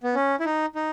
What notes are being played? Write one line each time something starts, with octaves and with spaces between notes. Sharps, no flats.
B3
C#4
E4
D#4
D#4